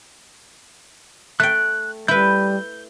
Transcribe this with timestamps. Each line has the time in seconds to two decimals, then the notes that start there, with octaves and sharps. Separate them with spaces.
1.40 A3 G5 F#6
2.08 G3 E4 B4 G6